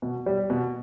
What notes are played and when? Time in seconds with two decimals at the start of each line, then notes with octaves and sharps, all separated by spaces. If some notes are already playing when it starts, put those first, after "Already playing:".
0.02 B2
0.26 G3
0.50 B2